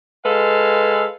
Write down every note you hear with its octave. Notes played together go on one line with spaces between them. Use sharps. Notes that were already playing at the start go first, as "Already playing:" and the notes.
G#3 A4 B4 F5